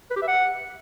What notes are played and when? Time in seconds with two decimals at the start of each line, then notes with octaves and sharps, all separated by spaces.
0.11 B4
0.16 G4
0.22 E5
0.28 F#5